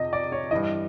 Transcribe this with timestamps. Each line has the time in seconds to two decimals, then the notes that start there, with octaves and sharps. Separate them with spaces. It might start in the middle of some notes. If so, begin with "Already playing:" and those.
Already playing: F2 C3 D#5
0.13 D5
0.32 C#5
0.51 G2 E3 D#5